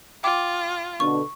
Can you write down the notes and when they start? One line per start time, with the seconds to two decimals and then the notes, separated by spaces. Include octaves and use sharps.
0.24 F4 G5 D6
1.00 B2 D3 C#6